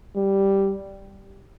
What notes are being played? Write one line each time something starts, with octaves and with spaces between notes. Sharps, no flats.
G3